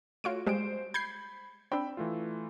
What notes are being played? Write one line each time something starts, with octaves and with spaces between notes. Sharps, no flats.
A3 F4 F#4 C#5 D7
G3 G#3 C5 D7
B5 G6 G#6 C7
C4 D4 G5 B5 E6
E3 A3 F4